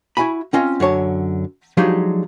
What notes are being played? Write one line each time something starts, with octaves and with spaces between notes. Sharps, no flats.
E4 F#4 E5 G#5 B5
C4 C#4 F4 D#5
F#2 D3 C#5 A5
F3 F#3 G#3 D4 D#4 G4